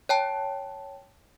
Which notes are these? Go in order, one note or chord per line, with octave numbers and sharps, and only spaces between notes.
C#5 G5 A5